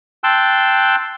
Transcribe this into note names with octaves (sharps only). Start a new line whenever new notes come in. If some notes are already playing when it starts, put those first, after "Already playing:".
G5 A5 C6 E6 F#6